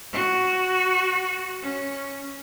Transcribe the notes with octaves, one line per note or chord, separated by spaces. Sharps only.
F#4
C#4